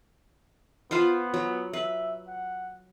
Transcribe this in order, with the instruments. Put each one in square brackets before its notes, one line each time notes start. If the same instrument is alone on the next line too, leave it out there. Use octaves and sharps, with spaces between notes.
[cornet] B3 [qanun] F4 B4 C5
[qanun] F#3
[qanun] B4 [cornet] E5
[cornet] F#5